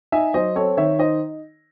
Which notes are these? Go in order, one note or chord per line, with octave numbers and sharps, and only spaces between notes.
D#4 E5 G#5
F#3 C5 D#5
C4 A4 C#5
D#3 C#5 E5
D#4 C5 D#5